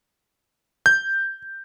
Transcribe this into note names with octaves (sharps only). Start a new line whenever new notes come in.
G6